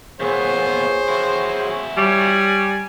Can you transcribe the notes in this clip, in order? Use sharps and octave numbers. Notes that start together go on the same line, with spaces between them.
A#2 B3 G#4 C5 C#5
E4 F#4
G3 C#5 G#5